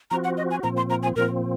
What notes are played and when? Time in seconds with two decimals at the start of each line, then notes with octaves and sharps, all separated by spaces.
0.11 F3 C4 F#4 A#5
0.24 F#5
0.37 D#5
0.51 G#5
0.63 A#2 F3 C4 A#5
0.77 C6
0.90 A#5
1.03 G#5
1.16 A#2 F3 C4 A#4